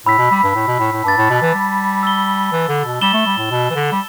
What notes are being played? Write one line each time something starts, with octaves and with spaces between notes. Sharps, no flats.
A2 B5 E6 B6
B2
G3
G2
A2
B2
A2
A2
G2 A5 D6 A6
A2
B2
E3
G3
E6 A6 G7
E3
D3
B2
G3 E6 A6 E7 G7
A3
G3
A2
B2
E3
D3
G3